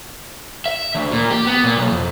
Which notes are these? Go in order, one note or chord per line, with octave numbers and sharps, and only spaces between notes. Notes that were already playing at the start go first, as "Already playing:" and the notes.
E5
D2
A#2
G4
B3
A#2
B1
F2